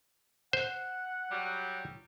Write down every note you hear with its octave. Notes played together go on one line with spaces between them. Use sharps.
C5 F#5
F#3 G3